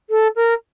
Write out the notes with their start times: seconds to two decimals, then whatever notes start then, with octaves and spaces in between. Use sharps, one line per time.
0.10 A4
0.36 A#4